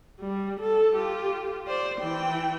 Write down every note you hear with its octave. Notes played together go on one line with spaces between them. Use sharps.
G3
A4
F4 G4
C5 D5
E3 G5